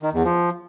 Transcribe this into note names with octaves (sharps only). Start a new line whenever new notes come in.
D#3
E2
F3